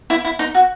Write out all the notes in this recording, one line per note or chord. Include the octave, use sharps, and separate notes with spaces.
E4
E4
D#4
F#4